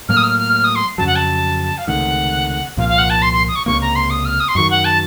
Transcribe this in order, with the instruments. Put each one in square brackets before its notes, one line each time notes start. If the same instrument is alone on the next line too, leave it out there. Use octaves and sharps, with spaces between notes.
[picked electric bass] A2 F#3 A#3 [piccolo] F6
[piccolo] D#6
F6
F6
F6
D#6
C6
[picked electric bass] F2 C#3 F#3 [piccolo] A5
[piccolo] F#5
A5
F5
[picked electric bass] C#2 C3 D#3 A3 [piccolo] F#5
[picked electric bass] C2 A#2 F3 A#3 [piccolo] F5
[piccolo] F5
F#5
A5
C6
C6
D#6
C#6
[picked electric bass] C#2 C3 F3 A#3 [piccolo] C#6
[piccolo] A#5
C6
D#6
F6
D#6
C6
[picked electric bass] F#2 D#3 F#3 [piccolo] C#6
[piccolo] F#5
A5